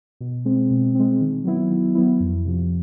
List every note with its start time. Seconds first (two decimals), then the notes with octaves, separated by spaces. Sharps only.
0.20 B2
0.45 G#3 C4
0.71 B2
0.95 G#3 C4
1.21 D#3
1.44 F#3 B3 E4
1.70 D#3
1.95 F#3 B3 E4
2.20 F2
2.45 C3 F3